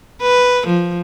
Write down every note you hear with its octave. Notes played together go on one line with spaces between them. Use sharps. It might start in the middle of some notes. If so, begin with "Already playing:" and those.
B4
F3